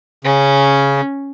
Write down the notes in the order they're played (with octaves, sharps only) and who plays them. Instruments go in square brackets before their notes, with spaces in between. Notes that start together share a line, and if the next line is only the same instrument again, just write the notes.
[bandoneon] C#3 [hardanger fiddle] C#4